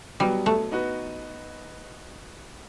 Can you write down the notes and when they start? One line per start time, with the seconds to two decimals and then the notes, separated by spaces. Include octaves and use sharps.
0.20 B2 F#3 G3 B3
0.46 A3
0.72 B3 D#4 F#4 B4